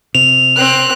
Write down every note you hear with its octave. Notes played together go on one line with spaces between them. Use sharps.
C3 F7
C4 F#6